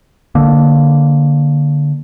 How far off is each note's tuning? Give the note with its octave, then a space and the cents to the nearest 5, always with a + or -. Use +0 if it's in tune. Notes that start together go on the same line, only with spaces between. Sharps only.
D3 +0 A#3 +0